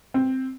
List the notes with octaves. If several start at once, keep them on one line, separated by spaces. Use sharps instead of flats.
C4